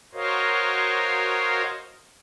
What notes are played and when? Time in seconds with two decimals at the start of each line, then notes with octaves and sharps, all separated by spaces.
0.14 F#4 A#4 C5 C#5 D#5 F5